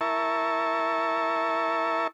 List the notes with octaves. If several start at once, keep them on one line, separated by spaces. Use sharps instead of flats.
E4 A#4 E5 A5 C#6